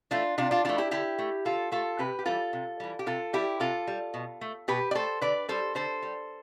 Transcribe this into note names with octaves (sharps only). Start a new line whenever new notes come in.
E3 A3 D4 F4
C3 D4 F4
D4 F4
E3 A3 D4 F4
E4 G4
D3 E4 G4
A3
D3 F4 A4
A3 F4 A4
C3 G4 B4
G4
E3 G3 F4 A4
C3
E3 G3
G4
C3 F4 A4
G3 E4 G4
C3 F4 A4
G3
B2
A3
B2 G4 B4
D5
A3 A4 C5
D3 B4 D5
G3 A4 C5
D3 A4 C5
G3